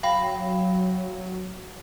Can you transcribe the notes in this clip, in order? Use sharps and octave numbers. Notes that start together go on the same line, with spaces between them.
F#3 F5 G5 B5